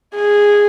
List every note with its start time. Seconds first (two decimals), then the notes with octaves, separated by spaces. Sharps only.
0.15 G#4